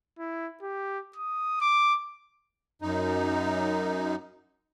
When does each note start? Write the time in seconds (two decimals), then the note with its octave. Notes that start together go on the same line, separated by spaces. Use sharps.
0.19 E4
0.63 G4
1.16 D#6
1.61 D6
2.82 F#2 D#4